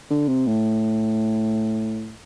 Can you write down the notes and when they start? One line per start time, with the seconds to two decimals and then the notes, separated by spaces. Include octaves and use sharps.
0.10 D3
0.28 C3
0.47 A2